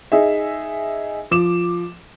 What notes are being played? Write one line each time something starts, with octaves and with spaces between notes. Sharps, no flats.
D#4 G#4 E5
F3 D6 E7